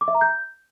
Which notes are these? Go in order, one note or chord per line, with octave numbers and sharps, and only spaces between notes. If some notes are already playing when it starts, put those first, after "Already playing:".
D6
E5
A#5
G6